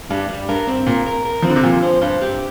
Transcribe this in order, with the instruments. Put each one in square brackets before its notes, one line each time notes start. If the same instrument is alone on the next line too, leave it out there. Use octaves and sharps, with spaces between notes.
[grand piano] G2 [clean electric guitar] G3
[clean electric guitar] G3
[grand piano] G2 [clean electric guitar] A#4
[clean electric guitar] C4
[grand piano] A#2 [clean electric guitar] A#4
[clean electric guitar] A#4
A#4
[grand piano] F3 [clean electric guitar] C4
[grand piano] D3
C3
[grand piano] A#2 [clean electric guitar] F3
[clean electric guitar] C5
[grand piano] G2 [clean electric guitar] C5
[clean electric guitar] G4